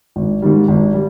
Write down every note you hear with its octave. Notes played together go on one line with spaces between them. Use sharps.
G#1
G#2 D#3 G3
G#1
G3